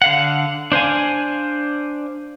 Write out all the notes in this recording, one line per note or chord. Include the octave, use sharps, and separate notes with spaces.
D3 F5 F#5
D4 C5 F5 G#5